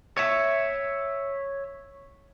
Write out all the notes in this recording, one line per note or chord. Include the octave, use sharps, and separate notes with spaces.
C#5 E5